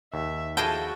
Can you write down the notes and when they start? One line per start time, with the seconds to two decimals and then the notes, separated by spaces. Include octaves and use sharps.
0.14 D#2 E5
0.57 F3 E4 F#4 G#4 A4 D#5 G5